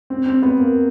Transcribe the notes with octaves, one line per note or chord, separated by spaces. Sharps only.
C4
C4
B3
A#3